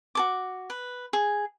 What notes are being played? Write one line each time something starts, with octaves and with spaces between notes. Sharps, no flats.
F#4 A4 D6
B4
G#4